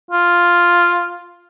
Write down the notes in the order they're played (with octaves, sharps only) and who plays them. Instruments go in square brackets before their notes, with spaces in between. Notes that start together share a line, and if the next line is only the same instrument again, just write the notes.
[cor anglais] F4